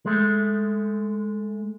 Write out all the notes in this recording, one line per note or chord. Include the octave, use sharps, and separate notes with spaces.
G#3 A3